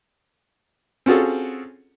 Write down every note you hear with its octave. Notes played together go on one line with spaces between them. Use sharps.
C4 C#4 F4 F#4 G#4 A4